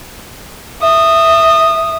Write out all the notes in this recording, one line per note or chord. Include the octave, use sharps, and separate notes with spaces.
E5 D#6